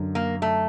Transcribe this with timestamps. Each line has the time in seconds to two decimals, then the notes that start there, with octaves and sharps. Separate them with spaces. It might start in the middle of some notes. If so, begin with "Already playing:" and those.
Already playing: F#2 D3
0.15 A#3
0.42 A3